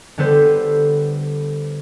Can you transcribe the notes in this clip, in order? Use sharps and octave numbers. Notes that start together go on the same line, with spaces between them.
D3 G3 B3 A4 B4 C5